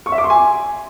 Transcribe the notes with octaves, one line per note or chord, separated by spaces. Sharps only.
C#6
E5
D6
C6
G#5